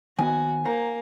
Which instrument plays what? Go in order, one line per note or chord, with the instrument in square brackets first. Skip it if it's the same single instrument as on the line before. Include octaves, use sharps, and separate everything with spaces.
[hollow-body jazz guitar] D#3 B3 [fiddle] F#4 [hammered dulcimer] G#5
[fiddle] A#3 [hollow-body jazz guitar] C5 F#5 A#5